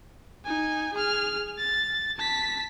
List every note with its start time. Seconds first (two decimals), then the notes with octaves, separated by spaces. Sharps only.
0.45 D#4 G#5
0.93 G#4 F6
1.58 A6
2.16 A5 B6